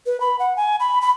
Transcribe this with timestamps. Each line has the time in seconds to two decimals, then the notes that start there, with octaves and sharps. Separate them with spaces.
0.06 B4
0.20 B5
0.39 F#5
0.57 G#5
0.80 B5
1.02 B5